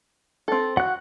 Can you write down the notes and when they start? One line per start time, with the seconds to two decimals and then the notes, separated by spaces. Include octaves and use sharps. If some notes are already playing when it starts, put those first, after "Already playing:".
0.48 C4 A4
0.77 F#4 F#5 F#6